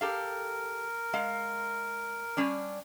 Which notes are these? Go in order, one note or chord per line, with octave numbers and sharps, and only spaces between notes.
G4 A4 A#4 F5
G#3 F5
G3 C#4 D4